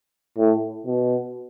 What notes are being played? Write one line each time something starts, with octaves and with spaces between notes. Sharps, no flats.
A2
B2